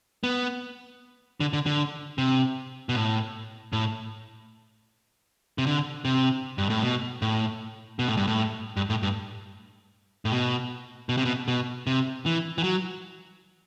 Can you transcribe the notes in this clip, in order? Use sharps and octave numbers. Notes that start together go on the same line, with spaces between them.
B3
D3
D3
D3
C3
B2
A2
A2
C3
D3
C3
G2
A2
B2
A2
B2
A2
G2
A2
G2
A2
G2
A2
B2
B2
C3
B2
B2
C3
E3
E3
F#3